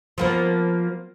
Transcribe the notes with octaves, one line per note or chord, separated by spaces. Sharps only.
F3 A#3 B3